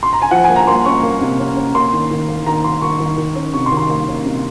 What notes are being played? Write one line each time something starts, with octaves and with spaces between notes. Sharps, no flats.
C6
A#5
G#5
F3 F#5
G#5
A#3
A#5
A#3 C6
C#4 C#6
A#3
C3
C#4
C#4
A#3 C6
D#3
D#3
A#3
D#3 A#5
D#3 C6
D#3 C#6
D#3
D#3
C#4
C3 C#6
C6
D#3
C6
A#3
C#4
C3